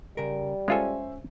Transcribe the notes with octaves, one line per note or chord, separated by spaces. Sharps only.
C#3 G3 A#4
G#3 C#4 F4 A4 C5 E5 G#5